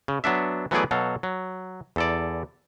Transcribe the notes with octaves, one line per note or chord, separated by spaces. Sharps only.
C#3
F#3 B3 D4 E5
E3 F#3 A3 B3 G#4 D5
B2 F#3 A4 F5
F#3
E2 A4 D5